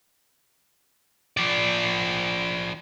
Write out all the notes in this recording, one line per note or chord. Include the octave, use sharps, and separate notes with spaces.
F3 D5